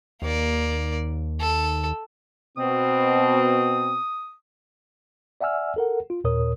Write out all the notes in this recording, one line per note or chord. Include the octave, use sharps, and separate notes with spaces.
D#2 A#3 D5
A4
B2 C4 D#6
D5 E5 F#5 G#5 E6 F6
A4 A#4 F#5
F4
D#2 A#2 A#4 C#5 D#6